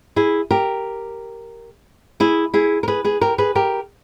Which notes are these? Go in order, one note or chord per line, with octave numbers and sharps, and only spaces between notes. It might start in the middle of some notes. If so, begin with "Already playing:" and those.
E4 G#4
G4 A#4
E4 G#4
E4 G#4
A#4
G#4 B4
G#4 B4
G4 A#4
G#4 B4
G4 A#4